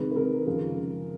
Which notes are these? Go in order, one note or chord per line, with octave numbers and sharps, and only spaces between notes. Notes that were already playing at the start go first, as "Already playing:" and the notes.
Already playing: C3 D#3 G#3 B4
B4
C3 D#3 G#3 A#4
F#2 C#3 F3 G#3